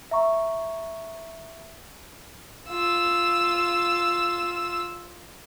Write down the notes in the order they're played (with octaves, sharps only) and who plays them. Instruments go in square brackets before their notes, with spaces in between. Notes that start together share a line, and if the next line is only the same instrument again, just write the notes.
[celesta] E5 A#5 C#6
[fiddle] F4 E6